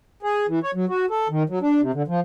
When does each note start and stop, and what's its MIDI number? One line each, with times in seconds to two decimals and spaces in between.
0.23 0.46 68
0.48 0.59 52
0.63 0.71 73
0.74 0.85 54
0.89 1.06 66
1.10 1.28 69
1.29 1.43 51
1.50 1.59 54
1.61 1.81 62
1.81 1.91 48
1.94 2.03 50
2.08 2.20 53